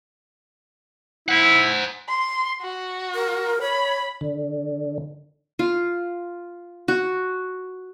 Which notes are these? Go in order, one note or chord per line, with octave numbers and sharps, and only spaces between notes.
E4 C5 F#5
C6
F#4
A#4
C#5 B5
D3
F4
F#4